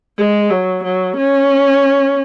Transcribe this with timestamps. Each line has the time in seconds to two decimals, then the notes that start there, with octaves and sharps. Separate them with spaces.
0.18 G#3
0.50 F#3
0.84 F#3
1.16 C#4